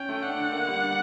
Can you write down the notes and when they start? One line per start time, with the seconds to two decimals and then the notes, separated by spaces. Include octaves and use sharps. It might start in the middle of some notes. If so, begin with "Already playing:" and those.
Already playing: C#4 G5
0.09 A3
0.24 D4 F#5
0.37 D3
0.52 A#3
0.67 G3
0.82 D4